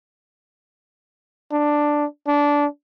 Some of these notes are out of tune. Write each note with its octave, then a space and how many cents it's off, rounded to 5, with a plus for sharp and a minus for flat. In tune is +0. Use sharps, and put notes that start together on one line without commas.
D4 +5
D4 -15